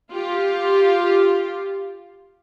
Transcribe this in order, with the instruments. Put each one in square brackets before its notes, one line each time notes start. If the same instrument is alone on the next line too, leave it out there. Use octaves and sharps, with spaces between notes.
[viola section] F4 G4